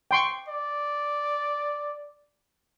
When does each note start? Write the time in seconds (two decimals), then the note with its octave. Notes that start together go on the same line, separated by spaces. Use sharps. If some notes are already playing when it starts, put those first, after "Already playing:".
0.11 G5 C6 C#6
0.48 D5